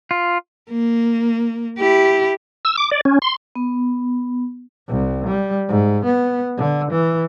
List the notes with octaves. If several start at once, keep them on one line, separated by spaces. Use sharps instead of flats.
F4
A#3
E4 G4
E6
D6
D5
C#4
C6
B3
C2
G3
G#2
B3
D3
E3